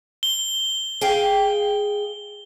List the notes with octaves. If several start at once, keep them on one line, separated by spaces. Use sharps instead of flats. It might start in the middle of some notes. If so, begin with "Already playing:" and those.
G7
G#4 F5 G5